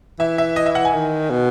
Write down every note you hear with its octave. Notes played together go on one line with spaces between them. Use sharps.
E3 E5
E5
D#5
E5
F#5
G#5
D#3
B2